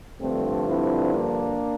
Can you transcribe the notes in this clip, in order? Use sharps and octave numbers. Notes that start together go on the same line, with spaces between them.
G2 D3 F3 A3 C4
C4 E4
A#3 D4